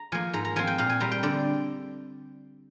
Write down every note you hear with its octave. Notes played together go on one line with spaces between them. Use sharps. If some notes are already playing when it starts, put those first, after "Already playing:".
Already playing: A#5
F3 A#3 G#5
G#2 A#5
A#5
F3 C4 G#5
G5
A#2 F5
G#5
G3 C4 A#5
G5
D3 D5